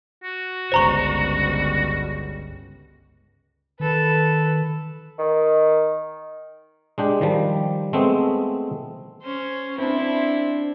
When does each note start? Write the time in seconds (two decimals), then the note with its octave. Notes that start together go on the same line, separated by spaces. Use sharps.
0.24 F#4
0.72 G1 C#2 C5 A#5 C#6
3.80 D#3 A4 B4
5.19 D#3
6.98 G#3 D4 G4
7.21 D#3 F3 G3
7.93 G#3 A3 B3 C4
9.22 C#4 C5
9.78 C4 D4 E4 C5